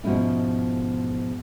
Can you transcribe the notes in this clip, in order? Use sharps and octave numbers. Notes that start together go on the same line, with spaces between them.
G#2 B2 F3 G#3 C#4 E4